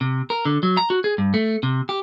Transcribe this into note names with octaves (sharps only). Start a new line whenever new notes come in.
C3
A#4
D3
F#3
A#5
F#4
G#4
G2
A3
C3
G4